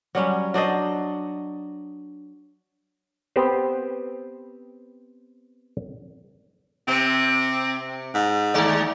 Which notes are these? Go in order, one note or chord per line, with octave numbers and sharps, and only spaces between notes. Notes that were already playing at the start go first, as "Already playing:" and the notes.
F#3 G3 C#4
F#3 D4 C5 D#5
B3 C4 G4 B4 C5
C3 C4
G#2
D#2 G#3 D5